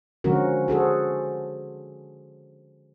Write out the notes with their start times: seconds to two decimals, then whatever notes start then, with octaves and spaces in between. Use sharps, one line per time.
0.24 D3 F3 G#3 C#4 F#4 A#4
0.68 F#4 G#4 A4 C5